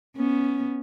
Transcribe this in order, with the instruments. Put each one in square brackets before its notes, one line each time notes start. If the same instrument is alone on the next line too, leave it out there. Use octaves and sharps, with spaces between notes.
[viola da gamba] B3 C#4